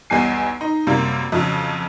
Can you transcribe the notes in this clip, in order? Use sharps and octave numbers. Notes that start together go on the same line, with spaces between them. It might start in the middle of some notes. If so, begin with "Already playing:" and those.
B1 E2 G3 G#5 C7
D#4
F#2 C3 G3 A#3
F2 C#3 F#3